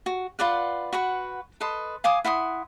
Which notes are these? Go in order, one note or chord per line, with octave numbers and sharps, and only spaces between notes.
F#4
F4 B4 D5 F#5
F#4 B4 F#5 C#6
A4 B4 D#5 C6
F5 G#5 D6 D#6
E4 F#5 C6 D#6